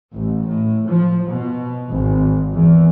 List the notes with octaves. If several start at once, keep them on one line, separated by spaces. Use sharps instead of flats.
A1
A2
F3
B2
G#1
E2